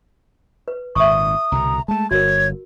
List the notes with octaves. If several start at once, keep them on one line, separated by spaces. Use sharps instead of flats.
B4
G#1 A#2 E5 C#6 D#6
C2 B2 D3 A#5
G#3 A3 A5
G1 F#4 A#4 C#5 G#6